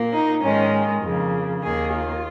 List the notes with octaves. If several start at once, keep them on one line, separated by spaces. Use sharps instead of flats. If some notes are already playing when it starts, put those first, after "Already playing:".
Already playing: A#2 A#3
D#4
G#2 D#3 G#3 C#4
F2 C#3 A#3
D#2 D#3 A#3 G#4
F4